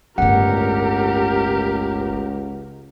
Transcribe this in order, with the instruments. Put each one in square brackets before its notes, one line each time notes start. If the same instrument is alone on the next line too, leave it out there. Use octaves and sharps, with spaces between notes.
[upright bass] G1 A2 [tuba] C#2 [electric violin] G4 A#4 [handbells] F#5